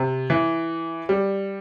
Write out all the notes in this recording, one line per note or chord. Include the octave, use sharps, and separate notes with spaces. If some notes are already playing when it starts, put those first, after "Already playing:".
Already playing: C3
E3
G3